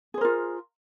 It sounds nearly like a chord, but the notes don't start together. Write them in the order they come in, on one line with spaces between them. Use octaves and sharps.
G#4 C5 A#4 F4